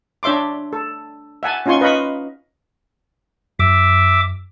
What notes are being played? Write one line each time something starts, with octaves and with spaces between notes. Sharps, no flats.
D4 C#5 E5 C6 D6
A4
E5 F#5 G#5 A5
C#4 D#4 F4 G#5 C6 C#6
B4 D#5 F5 B5 C#6
F#2 E5 D6